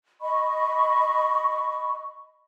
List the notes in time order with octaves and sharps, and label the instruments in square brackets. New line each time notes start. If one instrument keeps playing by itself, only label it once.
[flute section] D#5 B5 C#6